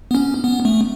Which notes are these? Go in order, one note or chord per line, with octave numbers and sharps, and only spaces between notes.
B3
C#4
B3
A3